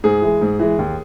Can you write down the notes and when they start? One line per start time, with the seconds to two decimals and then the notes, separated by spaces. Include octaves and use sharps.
0.04 G#2 G#4
0.22 E3 G#3
0.41 G#2
0.59 E3 G#3
0.79 D#2